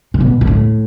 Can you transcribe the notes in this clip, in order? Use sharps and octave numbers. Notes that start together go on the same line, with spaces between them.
C3
B2
B2
A2